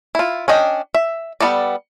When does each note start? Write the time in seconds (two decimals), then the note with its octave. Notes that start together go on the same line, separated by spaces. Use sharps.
0.15 E4 F4
0.48 C#4 D4 D#5 G5
0.94 E5
1.40 G3 B3 A4 D5